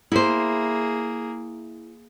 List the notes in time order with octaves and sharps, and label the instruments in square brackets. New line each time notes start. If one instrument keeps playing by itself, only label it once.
[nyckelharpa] A#3 G#4 [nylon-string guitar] E4 C5